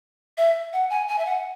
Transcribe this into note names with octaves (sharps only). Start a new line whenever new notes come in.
E5
F#5
G#5
G#5
E5
F#5